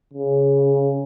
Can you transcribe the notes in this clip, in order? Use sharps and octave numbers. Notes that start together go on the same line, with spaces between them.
C#3